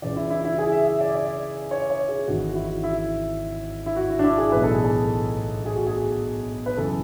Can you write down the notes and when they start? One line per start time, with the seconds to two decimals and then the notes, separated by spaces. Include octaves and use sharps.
0.02 C#2 C#3 E3 D5
0.16 E4
0.30 E4
0.44 E4
0.59 G#4
0.72 E5
0.87 E5
1.01 D5
1.15 D5
1.71 C#5
1.90 C#5
2.09 G#4
2.27 G#1 G#2 E3 F#4
2.49 F#4
2.55 E4
2.84 E4
3.86 E4
3.96 F#4
4.10 E4
4.19 D4
4.24 E4
4.38 G#4
4.52 B1 A2 E3 B4
4.63 A4
4.74 G#4
4.85 A4
5.65 G#4
5.76 F#4
5.87 G#4
6.66 B4
6.77 F#1 F#2 E3 A4